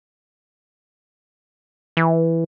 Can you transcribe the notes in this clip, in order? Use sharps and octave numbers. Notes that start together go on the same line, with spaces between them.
E3